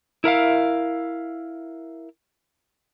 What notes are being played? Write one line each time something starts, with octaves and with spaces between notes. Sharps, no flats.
E4 A#4 E5 F5